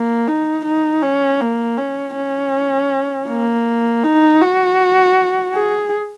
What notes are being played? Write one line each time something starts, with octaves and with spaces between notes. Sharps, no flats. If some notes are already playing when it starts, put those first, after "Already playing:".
Already playing: A#3
D#4
D#4
C#4
A#3
C#4
C#4
A#3
D#4
F#4
G#4